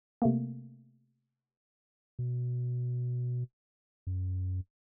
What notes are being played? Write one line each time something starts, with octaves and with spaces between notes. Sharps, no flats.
C3 A3 A#3
B2
F#2